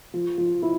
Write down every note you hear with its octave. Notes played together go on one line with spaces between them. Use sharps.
F3
F3
E4